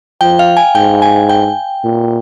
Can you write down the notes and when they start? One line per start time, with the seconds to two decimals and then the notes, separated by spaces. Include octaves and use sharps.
0.21 F3 G5
0.39 F5
0.57 G#5
0.75 G#2 G5
1.02 G#5
1.29 G5
1.84 A#2